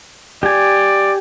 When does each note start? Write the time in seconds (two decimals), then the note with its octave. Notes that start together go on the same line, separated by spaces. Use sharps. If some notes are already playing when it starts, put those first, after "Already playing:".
0.43 G4 D5 G#5